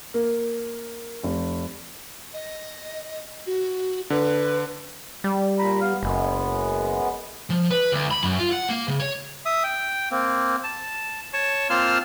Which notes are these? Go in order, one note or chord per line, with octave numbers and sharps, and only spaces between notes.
A#3
F1
D#5
F#4
D3 B4
G3
A#2 A#5 B5
B3 F5 F6
F#1 F#2 G#3 B3
F3
B4
D2
B5
F#2
F4
F#5
A#3
C#3
C#5
E5 D#6
G5
A#3 C4
A5
C#5 A5 C#6
A#3 C4 F4 A5 C6 F6